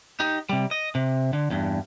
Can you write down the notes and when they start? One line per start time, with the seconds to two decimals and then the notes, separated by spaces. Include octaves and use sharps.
0.20 D#4 G4
0.49 C3 G3
0.71 D#5
0.95 C3
1.33 D3
1.50 E2 G2